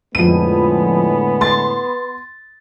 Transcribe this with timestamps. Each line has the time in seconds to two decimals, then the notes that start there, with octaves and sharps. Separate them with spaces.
0.15 F2 A2 D3 G#3 B3 D#7
1.41 C6 A6